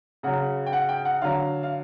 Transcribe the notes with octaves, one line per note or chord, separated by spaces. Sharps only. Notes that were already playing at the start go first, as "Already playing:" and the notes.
C#3 F#3 F#5
G5
F#5
G5
F#5
D3 F#3 F5
F5